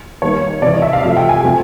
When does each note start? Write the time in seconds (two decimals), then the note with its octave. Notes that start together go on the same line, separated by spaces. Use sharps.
0.22 D#3 G3 A#3 D#4 C#5
0.62 C3 E3 G#3 D5
0.73 D#5
0.82 E5
0.93 F5
1.03 C3 F3 A3 E5
1.16 G5
1.29 G#5
1.43 C3 F3 A3